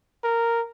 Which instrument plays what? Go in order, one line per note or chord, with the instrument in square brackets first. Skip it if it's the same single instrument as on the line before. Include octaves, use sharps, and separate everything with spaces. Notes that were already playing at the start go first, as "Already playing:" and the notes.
[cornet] A#4